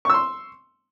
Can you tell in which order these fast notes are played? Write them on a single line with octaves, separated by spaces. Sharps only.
C#6 E6 C6